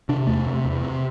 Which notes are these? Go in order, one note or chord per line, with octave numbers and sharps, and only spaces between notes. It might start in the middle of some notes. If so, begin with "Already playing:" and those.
C3 D4
E2 A3
C3
E2
C3